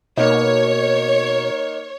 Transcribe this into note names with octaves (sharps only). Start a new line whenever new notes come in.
B2 A#3 D#4 C#5